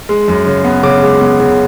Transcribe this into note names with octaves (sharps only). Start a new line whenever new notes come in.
G#3
F#2
C#3
B3
C#3 D6
G#3
B3
C#3